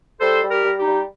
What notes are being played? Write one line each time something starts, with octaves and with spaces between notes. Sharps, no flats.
G3 A4 C5
G3
G4 A#4
G3
D#4 G4
G3